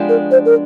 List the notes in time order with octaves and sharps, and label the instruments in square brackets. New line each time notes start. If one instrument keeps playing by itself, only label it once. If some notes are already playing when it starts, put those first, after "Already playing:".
Already playing: [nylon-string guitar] F3 G#3 B3 D4 G4
[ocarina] A#4
C5
A#4